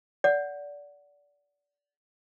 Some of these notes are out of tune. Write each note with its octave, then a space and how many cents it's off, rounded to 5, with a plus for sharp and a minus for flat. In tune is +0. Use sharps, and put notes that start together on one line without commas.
D5 -20 F#5 +0